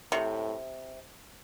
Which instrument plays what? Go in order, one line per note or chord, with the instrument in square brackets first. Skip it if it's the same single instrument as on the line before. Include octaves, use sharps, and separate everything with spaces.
[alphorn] A2 [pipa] C3